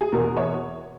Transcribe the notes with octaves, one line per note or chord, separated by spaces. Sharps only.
G#4
E2 B2 A#4
C#5